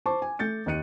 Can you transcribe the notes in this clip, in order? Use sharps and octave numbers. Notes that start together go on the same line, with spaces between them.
C5 A5 C#6 D6
G#5
A3 G6 A6 C#7
D#2 D#5 F#6 C#7 D#7